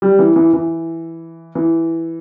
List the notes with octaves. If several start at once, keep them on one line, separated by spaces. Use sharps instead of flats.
G3
E3
E3
E3
E3